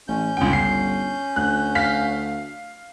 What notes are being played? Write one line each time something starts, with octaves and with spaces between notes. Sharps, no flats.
A1 C#4 G6
G1 C#2 G5
C7
D2 F#6
F5 B6